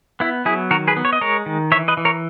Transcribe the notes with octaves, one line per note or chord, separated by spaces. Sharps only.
B3 E4
F#3 E4 G#4
D#3 F#4 A#4
G#4 B4
B3
C#5
D#5
G#3 A#4 C#5
D#3
E3 C#5 E5
B4 D#5
E3
A#4 C#5